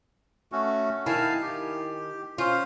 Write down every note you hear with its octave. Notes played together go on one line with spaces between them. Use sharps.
A3 C#4 F#4
D#3 E4 F5 G#5 A5
G4
C#4 F4 C5 F5